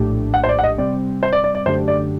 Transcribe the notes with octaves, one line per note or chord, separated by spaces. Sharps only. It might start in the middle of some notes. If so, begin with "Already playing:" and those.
Already playing: A#1 A2 A3 D4 G4
F#5
C5
D5
F#5
D#5
C3 G3 C4 D5
C5
D5
D5
D5
F#2 D3 A3 D4 G4 C5
D5